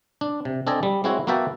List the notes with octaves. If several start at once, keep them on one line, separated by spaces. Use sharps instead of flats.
D4
C3
C4 D4 A4 D#5 G#5
G3
G#3 C4 E4 F#4 C#5
A#3 B3 F#4 E5 G5 A5